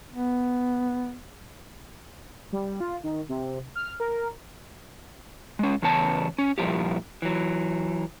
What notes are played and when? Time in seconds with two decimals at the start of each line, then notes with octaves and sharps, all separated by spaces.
0.10 B3
2.52 G3
2.80 F4
3.03 D#3
3.29 C3
3.75 F6
4.00 A#4
5.59 G#3 C#4
5.82 E2 C#3 B3 C#4 A5
6.38 C#4
6.58 G2 A#2 E3 F3 E4 G4
7.22 E3 F#3